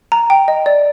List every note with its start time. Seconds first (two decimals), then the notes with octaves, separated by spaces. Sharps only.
0.12 A#5
0.30 G5
0.48 D#5
0.66 D5